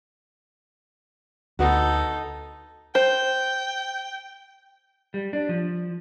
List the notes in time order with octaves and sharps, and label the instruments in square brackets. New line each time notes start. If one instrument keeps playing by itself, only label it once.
[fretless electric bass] D2 [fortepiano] B3 F#4 [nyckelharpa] D#4 A4
[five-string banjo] C5 [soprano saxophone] G5
[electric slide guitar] G3
D4
F3